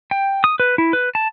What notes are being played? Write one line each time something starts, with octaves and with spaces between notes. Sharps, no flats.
G5
D#6
B4
E4
B4
A5